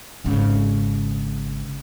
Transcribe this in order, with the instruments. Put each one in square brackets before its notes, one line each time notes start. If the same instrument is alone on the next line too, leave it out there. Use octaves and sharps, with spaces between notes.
[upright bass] G#1 C#3